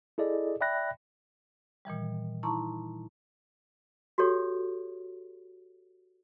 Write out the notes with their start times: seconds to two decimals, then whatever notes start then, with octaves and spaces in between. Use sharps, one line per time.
0.18 E4 G#4 A4 D5 D#5
0.60 D5 E5 G5 B5 F#6 A#6
1.85 A#2 D#3 E3 G3
2.43 D#4 E4 A5 A#5 C6 C#6
4.18 F#4 G4 A4 C#5